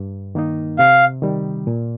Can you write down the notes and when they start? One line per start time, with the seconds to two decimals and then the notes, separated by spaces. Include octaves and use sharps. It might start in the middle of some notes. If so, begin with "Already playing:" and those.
Already playing: G2
0.35 D#3 A#3 D#4
0.79 C3 F5
1.22 D#3 G3
1.67 A#2